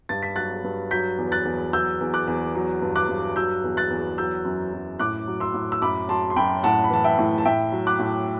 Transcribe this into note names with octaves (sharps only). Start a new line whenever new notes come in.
G2 A6
B6
F#3 F#6 A6
G2
F#3 G6 B6
E2
F#6 A6
E2
F#3 E6 G6
E2
D6 F#6
E2
F#3
G2
D6 F#6
G2
F#3 E6 G6
E2
F#6 A6
E2
F#3 E6 G6
F#2
F#2
A2 D6 F#6
F#3
C6 E6
A2
E6
F#2 B5 D6
F#3 A5 C6
C6
F#2 G5 B5
A2 F#5 A5
B5
E3 A5
E5 G5
A2
A5
A2 E5 G5
F#3
D6 F#6
A2